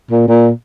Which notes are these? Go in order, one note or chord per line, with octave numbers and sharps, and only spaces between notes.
A#2
A#2